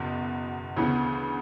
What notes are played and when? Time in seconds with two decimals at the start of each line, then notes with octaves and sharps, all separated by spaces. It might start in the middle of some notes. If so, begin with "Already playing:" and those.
Already playing: F#1 E2 B2
0.76 D2 C#3 E3 B3